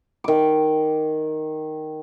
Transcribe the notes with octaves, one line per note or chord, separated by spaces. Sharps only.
D#3 D6